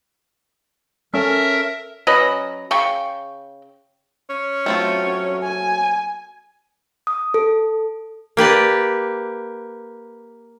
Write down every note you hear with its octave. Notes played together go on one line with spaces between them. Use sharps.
C#4 A4 A#4 E5
F#3 C#4 B4 D#5
C#3 G5 C#6
C#4
F#3 A3 C4 F4
G#5
D#6
A4
A#3 G4 B4 D5